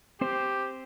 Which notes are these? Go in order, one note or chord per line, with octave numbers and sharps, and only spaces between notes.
C4 G4 C5